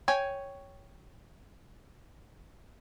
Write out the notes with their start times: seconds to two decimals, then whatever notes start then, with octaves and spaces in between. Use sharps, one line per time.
0.08 C#5 G5 G#5